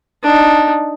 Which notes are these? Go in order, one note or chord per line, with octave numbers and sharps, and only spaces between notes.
D4 D#4